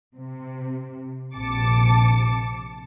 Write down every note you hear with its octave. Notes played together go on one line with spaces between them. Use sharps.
C3
A#1 C3 A5 D6 C#7